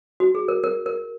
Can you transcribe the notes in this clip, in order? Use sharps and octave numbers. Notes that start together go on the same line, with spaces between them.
F#4
G#4
A#4
A#4
A#4